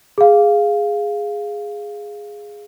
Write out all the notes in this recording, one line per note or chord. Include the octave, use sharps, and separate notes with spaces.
G#4 F5